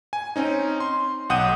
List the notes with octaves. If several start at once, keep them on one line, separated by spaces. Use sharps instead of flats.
G#5
C4 C#4 D#4
C6
B1 F#5 G5 D#6 G6 D#7